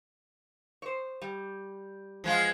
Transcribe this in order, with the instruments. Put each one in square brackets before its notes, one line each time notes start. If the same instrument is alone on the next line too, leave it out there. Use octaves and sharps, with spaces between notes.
[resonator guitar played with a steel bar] C5 C#5
G3
[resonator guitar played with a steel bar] E2 B3 F5 [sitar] F3 G#3 F4